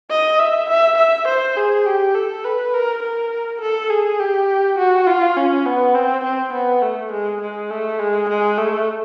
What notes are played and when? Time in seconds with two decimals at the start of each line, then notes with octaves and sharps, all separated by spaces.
0.10 D#5
0.39 E5
0.69 E5
0.98 E5
1.28 C5
1.56 G#4
1.86 G4
2.15 A4
2.44 B4
2.74 A#4
3.03 A#4
3.61 A4
3.90 G#4
4.19 G4
4.78 F#4
5.07 F4
5.36 C#4
5.66 B3
5.95 C4
6.24 C4
6.53 B3
6.82 A3
7.11 G#3
7.41 G#3
7.70 A3
7.99 G#3
8.29 G#3
8.58 A3